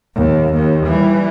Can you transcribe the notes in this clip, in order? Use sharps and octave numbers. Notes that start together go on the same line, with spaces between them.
D#2
D#2
E3 G3